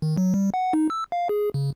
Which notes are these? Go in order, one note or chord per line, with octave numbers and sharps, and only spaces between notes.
D#3
F#3
G3
F#5
D#4
E6
F5
G#4
C#3